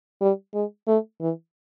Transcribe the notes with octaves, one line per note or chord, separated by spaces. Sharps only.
G3
G#3
A3
E3